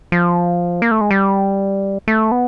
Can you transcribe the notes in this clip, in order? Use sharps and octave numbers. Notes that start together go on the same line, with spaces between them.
F3
A#3
A3
G#3
G3
A3
B3